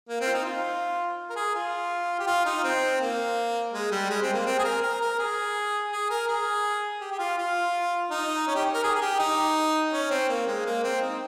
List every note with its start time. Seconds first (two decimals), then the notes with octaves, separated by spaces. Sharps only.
0.09 A#3
0.20 C4
0.26 F4
0.33 D#4
0.45 F4
1.30 A#4
1.36 G#4
1.55 F4
2.19 G4
2.27 F4
2.45 D#4
2.64 C4
3.01 A#3
3.73 G#3
3.91 G3
4.10 G#3
4.22 C4
4.33 A#3
4.46 C4
4.59 G#4
4.64 A#4
4.82 A#4
5.01 A#4
5.19 G#4
5.92 G#4
6.10 A#4
6.28 G#4
7.01 G4
7.12 G4
7.19 F4
7.38 F4
8.10 D#4
8.47 C#4
8.55 G4
8.74 A#4
8.84 G#4
8.95 G#4
9.01 G4
9.19 D#4
9.93 C#4
10.10 C4
10.29 A#3
10.47 G#3
10.66 A#3
10.84 C4
11.01 D#4